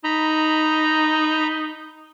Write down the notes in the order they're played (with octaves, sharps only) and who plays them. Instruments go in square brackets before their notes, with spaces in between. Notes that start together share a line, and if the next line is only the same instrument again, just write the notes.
[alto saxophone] D#4 [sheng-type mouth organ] A#5 B5